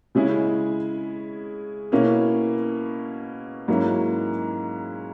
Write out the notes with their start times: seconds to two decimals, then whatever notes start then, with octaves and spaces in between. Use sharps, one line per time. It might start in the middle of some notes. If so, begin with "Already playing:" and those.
0.15 C#3 G#3 C#4 E4 G#4
1.92 B2 A#3 C#4 E4
3.68 G#2 F#3 A#3 C#4 E4